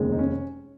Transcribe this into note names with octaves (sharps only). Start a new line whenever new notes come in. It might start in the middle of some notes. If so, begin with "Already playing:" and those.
Already playing: F1 D#2 C#3 G#3
D#4
C#4